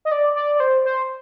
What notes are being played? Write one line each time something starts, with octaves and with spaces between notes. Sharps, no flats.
D#5
D5
D5
D5
C5
C5